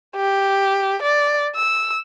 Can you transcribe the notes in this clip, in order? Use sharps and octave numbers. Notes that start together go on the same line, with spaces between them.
G4
D5
E6